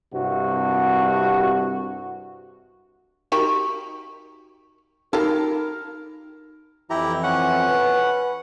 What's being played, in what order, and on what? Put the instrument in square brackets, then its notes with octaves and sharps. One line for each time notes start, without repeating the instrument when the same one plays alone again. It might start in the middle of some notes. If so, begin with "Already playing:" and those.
[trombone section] C2 G2 C3 F#4
[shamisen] D#4 G4 A#4 [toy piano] F#4 A#5 C#6
[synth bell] D#4 [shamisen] F4 G4 A4 [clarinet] A#4
[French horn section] F2 E3 [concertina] E4 G4 A#5
[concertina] C#4 F#5
[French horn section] B4